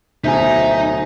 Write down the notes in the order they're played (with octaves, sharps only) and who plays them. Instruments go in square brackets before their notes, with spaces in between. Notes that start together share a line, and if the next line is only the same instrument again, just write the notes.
[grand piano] D1 B2 G#5 [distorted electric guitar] D#4 [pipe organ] C5 E5